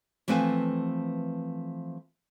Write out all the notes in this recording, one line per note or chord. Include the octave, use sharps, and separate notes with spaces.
E3 F3 A3 C4 B4 G#5